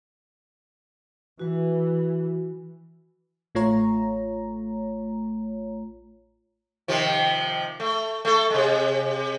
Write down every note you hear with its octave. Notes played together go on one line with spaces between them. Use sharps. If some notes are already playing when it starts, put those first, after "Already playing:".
E3 F#4 B4
A1 A3 F4 C#5 A#5
C3 D#3 F3
A3
A3 A4
C3 G#3